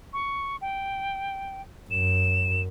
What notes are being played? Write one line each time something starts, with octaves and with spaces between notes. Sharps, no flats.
C#6
G5
F#2 E7